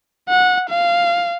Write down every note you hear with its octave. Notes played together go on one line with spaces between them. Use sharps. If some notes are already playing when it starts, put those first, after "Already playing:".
F#5
F5